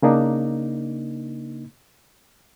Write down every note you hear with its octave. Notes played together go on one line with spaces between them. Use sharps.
C#3 A#3 D4 D#4